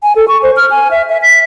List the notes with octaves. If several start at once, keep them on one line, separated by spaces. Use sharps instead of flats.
G#5
A4
C#6
C5
F6
G#5
E5
E5
B6